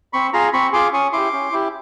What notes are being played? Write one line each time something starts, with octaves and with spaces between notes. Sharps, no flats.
C4 B5 C#6
F4 G#4 A#5 C6
C4 B5 C#6
F4 G#4 C6 D6
C#4 C#6 D#6
E4 G4 C6 D6
C#4
E4 G4